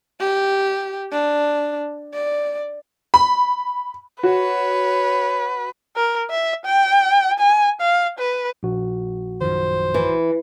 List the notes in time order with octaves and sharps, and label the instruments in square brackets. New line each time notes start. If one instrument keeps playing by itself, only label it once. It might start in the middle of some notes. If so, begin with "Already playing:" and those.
[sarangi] G4
D4
D5
[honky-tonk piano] B5
[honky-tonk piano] F#4 [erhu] B4 [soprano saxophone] C#5
[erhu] A#4
E5
G5
G#5
F5
B4
[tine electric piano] A#1 F#4
[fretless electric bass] F#2 D#3 F3 [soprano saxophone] C5
[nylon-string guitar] E3